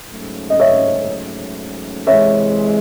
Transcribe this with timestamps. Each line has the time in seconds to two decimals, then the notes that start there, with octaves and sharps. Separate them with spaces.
0.11 G#2 F#3 A3 C#4
0.50 D#5
0.60 C#5 E5
2.07 C3 E3 G#3 C#5 E5